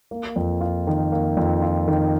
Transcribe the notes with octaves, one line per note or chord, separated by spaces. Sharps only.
A#3
F2
F4
D#3
A#3
F2
F4
D#3